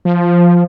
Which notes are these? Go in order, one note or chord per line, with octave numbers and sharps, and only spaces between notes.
F3